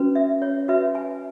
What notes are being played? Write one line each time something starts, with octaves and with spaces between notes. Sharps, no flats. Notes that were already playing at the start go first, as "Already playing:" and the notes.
Already playing: C#4 F#4 B4
E5
C#5
F#4 B4 E5
G#5